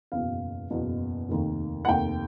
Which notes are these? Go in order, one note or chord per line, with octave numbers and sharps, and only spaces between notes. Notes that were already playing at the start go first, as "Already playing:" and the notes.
F#1 E2 B2 F5
F#1 E2 B2
F1 D#2 D#3
F#5
F1 D#2 D#3 G5